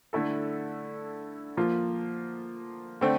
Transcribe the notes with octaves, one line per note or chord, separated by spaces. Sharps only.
D3 A3 E4 A4
F3 A#3 F4
D3 A3 C4